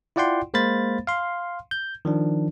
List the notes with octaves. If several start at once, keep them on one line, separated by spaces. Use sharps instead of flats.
E4 F4 D5 F#5 G5 C6
G#3 A#3 C5 F5 B5 A6
F5 C6
G6
D#3 F3 D4